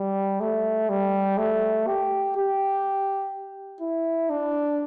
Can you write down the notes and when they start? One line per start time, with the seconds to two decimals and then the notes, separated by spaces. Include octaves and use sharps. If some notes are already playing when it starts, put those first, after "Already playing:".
Already playing: G3
0.41 A3
0.89 G3
1.38 A3
1.87 G4
2.36 G4
3.81 E4
4.30 D4